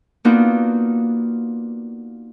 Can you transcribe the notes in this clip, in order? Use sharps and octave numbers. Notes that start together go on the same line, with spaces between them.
A#3 B3 D4 D#4 F4 F#4